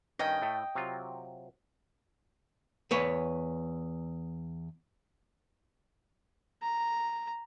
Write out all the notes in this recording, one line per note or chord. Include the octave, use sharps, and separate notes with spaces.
G2 D#3 C#4 D#5 G5
A2 A3
C3 F#3 F4
E2 B4 C#5
A#5